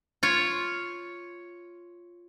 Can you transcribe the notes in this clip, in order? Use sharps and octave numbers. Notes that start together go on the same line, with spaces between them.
F4 C#5